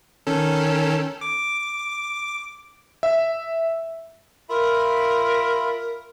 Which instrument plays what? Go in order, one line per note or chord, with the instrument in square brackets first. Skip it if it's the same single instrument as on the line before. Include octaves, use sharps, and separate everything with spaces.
[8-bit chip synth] D#3 C#4 A4
D6
[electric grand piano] E5
[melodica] F4 E5 B5 [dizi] A#4